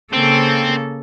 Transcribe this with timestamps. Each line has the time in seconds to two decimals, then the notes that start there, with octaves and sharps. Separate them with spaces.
0.13 C#3 A#3 C4 A4